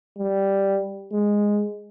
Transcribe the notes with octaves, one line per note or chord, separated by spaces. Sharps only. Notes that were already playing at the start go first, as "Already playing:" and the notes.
G3
G#3